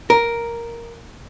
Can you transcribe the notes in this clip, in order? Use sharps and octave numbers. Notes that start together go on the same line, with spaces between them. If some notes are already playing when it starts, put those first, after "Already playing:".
A#4